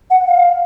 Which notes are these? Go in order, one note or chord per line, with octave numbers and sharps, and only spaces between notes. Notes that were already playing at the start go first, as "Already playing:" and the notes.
F#5
F5